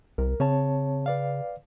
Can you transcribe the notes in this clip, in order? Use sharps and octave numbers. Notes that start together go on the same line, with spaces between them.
C2 A#4
C#3 C4 C#5 A5
B4 D5 F5